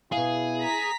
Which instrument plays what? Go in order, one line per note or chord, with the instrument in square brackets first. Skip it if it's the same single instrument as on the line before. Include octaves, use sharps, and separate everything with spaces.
[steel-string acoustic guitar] B2 F5 [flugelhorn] E4 [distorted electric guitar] G#4
[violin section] A#5 B6